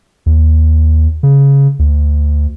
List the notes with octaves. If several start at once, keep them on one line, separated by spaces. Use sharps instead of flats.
D#2
C#3
D2